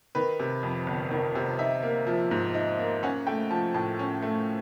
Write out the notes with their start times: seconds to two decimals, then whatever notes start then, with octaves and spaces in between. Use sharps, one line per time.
0.15 D#3 B4
0.40 C3
0.63 F2
0.87 G1
1.11 D#3
1.35 C3
1.59 D#4 E5
1.83 A#3
2.07 F3
2.31 G#2
2.54 D#4
2.79 A#3
3.03 C#4 F#5
3.27 A3 G5
3.50 F3 A5
3.74 A2 A5
3.99 C#4
4.22 A3